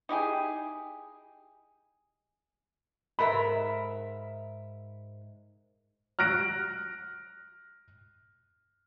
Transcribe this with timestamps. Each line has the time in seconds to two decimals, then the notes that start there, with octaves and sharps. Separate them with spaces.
0.09 D#4 E4 G4 G#4
3.19 G#2 A#4 E5 B5
6.19 F6 F#6 A#6 D7